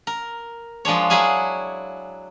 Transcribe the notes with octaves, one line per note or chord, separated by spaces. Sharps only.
A#4
F3 G#3 D4 C#5
F#3 E4 G#4 F5 G#5